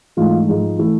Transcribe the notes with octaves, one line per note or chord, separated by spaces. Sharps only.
G#2 E3 A3 F4
G#2 F3 G#3
E3 A3 E4